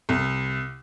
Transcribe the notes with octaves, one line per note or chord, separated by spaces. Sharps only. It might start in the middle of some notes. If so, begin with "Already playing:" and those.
C2